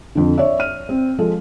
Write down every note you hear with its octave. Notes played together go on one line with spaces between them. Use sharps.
F2 D3
C#5 D5 E5
F6 D#7
C4
F3 G#3 A4